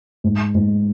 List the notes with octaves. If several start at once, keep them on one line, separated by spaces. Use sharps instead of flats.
G#2
G#2